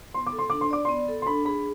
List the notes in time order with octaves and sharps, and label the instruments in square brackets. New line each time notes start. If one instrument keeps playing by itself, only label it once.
[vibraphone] B3 [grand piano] C6
[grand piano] D6
[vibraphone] A4
[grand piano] C6
[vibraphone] D4 [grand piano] D6
[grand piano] C6
[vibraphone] D5 [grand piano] D6
[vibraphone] B3 [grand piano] C6
[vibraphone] A4
[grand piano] C6
[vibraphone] D4 [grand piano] B5
[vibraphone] G#4 [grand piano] B5